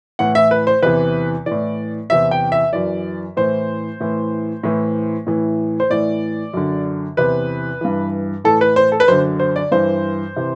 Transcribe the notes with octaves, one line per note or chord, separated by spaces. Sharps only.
A2 E3 F#5
E5
B4
C5
E2 C3 E3 B4
E3 D5
A2
E2 C3 E3 E5
G5
E5
F#2 E3 D5
A2 E3 C5
A2 E3
A2 E3
A2 E3
C5
A2 E3 D5
F#2 D3
E2 C3 E3 B4
G2 E3
A2 E3 A4
B4
C5
A4
B4
F#2 D3 C5
C5
D5
G2 E3 C5
C3 E3